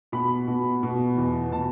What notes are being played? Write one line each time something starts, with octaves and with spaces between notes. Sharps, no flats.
B2 B5
B2
B2
E2
B2 A5